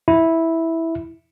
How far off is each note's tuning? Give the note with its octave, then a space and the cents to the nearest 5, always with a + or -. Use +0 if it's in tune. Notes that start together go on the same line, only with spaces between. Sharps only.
E4 -5